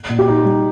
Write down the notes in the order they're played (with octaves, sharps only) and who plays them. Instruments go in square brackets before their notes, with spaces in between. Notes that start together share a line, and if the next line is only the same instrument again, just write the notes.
[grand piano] A#2
[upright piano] G4
[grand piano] D#4
G3